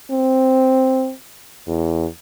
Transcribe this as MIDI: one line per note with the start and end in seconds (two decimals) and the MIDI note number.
0.11 1.12 60
1.68 2.06 40